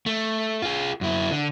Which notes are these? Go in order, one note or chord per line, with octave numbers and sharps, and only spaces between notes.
A3
F4 G#4
F#2 E4
D3